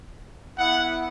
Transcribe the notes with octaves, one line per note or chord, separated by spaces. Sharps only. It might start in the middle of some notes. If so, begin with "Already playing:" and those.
B3 E4 F#5